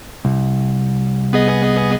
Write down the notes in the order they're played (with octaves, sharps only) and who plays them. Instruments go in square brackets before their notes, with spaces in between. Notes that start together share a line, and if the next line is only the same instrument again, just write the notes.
[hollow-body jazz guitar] C2
[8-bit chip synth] B3 G#4 D#5